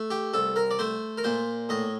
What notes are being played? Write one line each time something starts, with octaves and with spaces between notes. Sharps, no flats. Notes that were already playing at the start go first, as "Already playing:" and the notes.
Already playing: A3
G4
C2 A4
A#4
D5
A3 C5
A#4
A#2 C5
A2 D#5